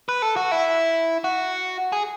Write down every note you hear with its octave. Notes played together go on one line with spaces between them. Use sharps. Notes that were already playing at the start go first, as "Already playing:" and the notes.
B4
A4
F#4
E4
F#4
G#4